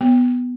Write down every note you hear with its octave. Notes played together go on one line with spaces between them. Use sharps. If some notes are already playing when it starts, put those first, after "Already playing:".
B3